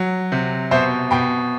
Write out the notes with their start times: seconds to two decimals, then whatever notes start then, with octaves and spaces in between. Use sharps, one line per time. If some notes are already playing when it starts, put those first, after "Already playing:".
Already playing: F#3
0.32 C3
0.71 B2 C5 E5
1.11 B2 G5 B5